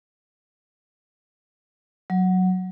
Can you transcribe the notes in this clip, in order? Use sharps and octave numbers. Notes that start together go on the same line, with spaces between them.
F#3